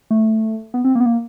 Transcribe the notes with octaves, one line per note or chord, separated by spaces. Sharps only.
A3
B3
C4
A#3
B3
A#3